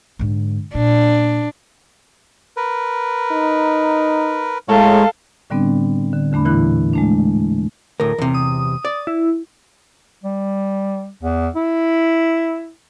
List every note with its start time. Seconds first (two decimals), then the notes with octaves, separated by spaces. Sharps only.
0.19 G#2 D3
0.75 A#2 D4
2.57 A#4 B4
3.32 D#4
4.68 A2 G#3 A4 A#4 C#5 F5
5.50 A2 D3 G3 B3 C4 D4
6.13 D3
6.32 E2 D3 A3 D4 B5
6.45 A#2 E3 E4 B5 F#6
6.94 G#3 A3 D4
8.00 D2 A2 A#4
8.18 E2 C3
8.35 D#6
8.85 D5
9.07 E4
10.23 G3
11.23 E2
11.56 E4